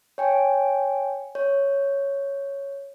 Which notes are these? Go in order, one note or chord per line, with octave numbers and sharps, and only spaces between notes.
C#5 G5 G#5
C#5